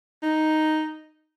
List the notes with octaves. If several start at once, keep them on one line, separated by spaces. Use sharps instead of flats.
D#4